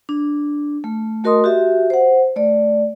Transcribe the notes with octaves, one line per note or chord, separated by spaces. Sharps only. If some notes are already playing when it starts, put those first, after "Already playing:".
D4
A3
A3 F#4 A#4 D#5 C6 D#6
F#4 G4 E5
C5 F#5
A3 D5